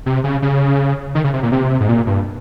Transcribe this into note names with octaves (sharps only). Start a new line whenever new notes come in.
C3
C#3
C#3
D#3
C#3
C3
A#2
C3
G#2
A#2
G2